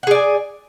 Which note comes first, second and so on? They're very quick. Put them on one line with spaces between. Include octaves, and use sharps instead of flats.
F#5 G#4 D5 G#5